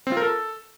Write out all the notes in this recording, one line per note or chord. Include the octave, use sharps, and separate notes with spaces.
C4
F4
A#4
A4